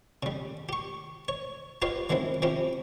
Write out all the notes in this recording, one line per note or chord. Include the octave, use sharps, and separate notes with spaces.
C#3 G3
G4 C#6
C#5
F4 G4 B4 C#5 D#5 F5
D#3 F#3 G#3 C4 E4
F3 C4 C#4 E4 G4